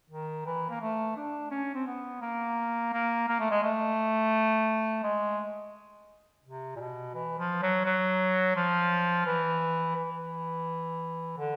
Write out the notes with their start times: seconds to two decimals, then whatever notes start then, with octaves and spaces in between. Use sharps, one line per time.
0.10 D#3
0.46 E3
0.70 A#3
0.81 A3
1.17 D4
1.51 C#4
1.75 C4
1.87 B3
2.21 A#3
2.93 A#3
3.28 A#3
3.40 A3
3.51 G#3
3.63 A3
5.03 G#3
6.44 C3
6.76 A#2
6.80 B2
7.15 E3
7.39 F3
7.62 F#3
7.85 F#3
8.56 F3
9.26 E3
9.97 E3
11.38 D3